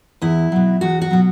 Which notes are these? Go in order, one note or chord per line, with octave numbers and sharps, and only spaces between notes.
E2 E4
B2 F#3
E2 F#4
F#4
B2 F#3